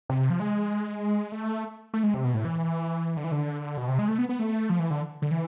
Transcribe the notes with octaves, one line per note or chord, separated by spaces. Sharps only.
C3
F3
G#3
A3
A3
G#3
C3
B2
A2
E3
D3
E3
D3
B2
C3
G#3
A3
B3
B3
A3
F3
E3
D3
D3
E3